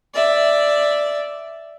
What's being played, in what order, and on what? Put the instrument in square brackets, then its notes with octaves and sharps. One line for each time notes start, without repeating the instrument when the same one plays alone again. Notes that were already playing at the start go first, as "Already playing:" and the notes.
[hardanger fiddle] D5 E5